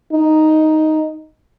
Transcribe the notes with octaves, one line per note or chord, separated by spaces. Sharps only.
D#4